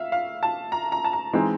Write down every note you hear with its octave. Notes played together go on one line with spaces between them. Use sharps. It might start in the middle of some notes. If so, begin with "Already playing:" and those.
Already playing: E5 F5
F5
A5
A#5
A#5
A5
A#5
E3 G#3 C4 D#4